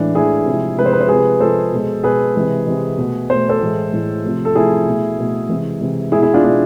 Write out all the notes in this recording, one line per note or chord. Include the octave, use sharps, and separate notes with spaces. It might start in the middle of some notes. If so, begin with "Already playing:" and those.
Already playing: A2 E3 G#3 D4
A2 E3 G#3 E4 G#4
C3 F3 G#3
C3 F3 G#3 B4
C5
B4
C5
C3 F3 G#3 G#4 B4
C3 F3 G#3 A4 C5
B2 G#3
B2 G#3 G#4 B4
C3 E3 G#3
C3 E3 G#3
B2 A3
B2 A3 C5
A4 C5
A2 E3 G#3
A2 E3 G#3
C3 F3 A3
A4
C3 F3 A3 E4 G#4
B2 A3
B2 A3
C3 E3 G#3
C3 E3 G#3
B2 G#3 E4 G#4
E4 G#4
D4 F4
B2 G#3 D4